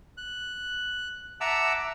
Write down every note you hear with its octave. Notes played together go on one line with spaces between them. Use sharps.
F#6
E5 F#5 A5 A#5 D6 E6